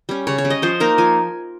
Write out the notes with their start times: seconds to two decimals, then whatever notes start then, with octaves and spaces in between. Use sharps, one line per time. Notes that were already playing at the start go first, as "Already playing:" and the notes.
0.09 G3 C#4
0.27 C#3 C#5
0.38 C#5
0.45 G3 C#4
0.50 D#5
0.62 F3 C5
0.80 A#3 D#4 A#4
0.98 F3 G#5